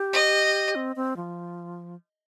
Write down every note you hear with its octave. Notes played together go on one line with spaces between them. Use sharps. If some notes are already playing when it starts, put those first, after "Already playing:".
Already playing: G4
D#5
C4
C4
F3